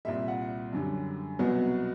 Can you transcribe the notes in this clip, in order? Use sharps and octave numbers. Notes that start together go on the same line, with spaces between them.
C2 A#2 G3 E5
F#5
F#2 D3 G3
C2 B2 F#3 B3